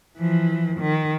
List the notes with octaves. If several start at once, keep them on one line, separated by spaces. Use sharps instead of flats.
E3 F3
D#3